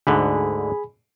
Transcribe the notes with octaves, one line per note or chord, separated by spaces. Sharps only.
D2 G#2 D3 G#4 G#5 B5